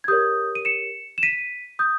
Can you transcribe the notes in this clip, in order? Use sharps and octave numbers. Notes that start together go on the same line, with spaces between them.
G#6
G4 A#4 C#5 D#6 G6
D#7
C#7 E7
E7
B6 D#7
D#6 G6